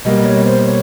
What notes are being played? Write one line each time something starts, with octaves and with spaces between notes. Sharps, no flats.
B2 G3 A#3 D#5
C#5
C5
C#5